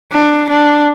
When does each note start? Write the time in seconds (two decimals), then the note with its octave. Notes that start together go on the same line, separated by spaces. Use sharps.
0.12 D4
0.49 D4